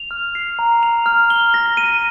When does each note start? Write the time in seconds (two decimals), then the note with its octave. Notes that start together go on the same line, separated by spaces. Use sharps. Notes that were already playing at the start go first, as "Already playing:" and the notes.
Already playing: F7
0.11 F6
0.35 C7
0.59 A#5
0.83 F7
1.06 F6
1.30 G7
1.54 A#6
1.77 D#7